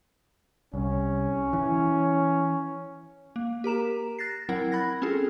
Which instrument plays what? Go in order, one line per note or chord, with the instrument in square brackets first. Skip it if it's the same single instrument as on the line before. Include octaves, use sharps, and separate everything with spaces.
[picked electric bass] C2 [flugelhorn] C#4
[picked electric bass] E3
[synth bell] A#3
G4 A#4 A#5 E7
F#6 A6 A#6 C7
F#3 C4 E4 A#4 F#5 A6
B5 F#6 G#6 A#6
C4 C#4 F4 G#4 A4